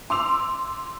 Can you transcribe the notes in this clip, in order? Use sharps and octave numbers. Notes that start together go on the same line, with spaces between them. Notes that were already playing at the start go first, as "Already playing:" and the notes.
C6 D6 E6 F7